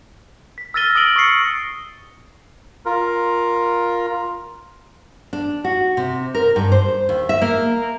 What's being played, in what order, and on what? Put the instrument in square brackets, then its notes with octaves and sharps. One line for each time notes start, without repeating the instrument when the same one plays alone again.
[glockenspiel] B6
E6 F6 A6 A#6 D#7 G7
D#6 A6 A#6 D7 F#7 G7
C#6 D#6 E6 A#6 C7 C#7
[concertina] F4 A#4
[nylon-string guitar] D4
F#4
C3
A#4
G2
C5
D#2
E5
A#3